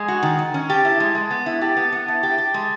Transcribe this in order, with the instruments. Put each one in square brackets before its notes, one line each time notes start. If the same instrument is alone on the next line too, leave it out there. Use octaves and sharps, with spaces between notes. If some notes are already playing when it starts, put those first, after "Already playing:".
Already playing: [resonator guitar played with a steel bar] G#3 [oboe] G#5
[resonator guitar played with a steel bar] F#4
D#3
D#3
C#4
[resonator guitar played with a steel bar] G4 [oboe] A5
[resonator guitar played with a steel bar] E4
G#3
G#3
B3
E4
[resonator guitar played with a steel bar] G4 [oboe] A5
[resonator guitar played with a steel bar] B3
B3
[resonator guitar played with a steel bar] E4 [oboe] A5
[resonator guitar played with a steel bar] G4
G4
G#3